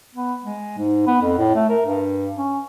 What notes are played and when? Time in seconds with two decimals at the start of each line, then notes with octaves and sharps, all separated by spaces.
0.15 B3
0.44 G#3
0.78 G#2
1.07 B3
1.22 F2
1.38 A2
1.55 A3
1.70 A#4
1.85 G2
2.36 C#4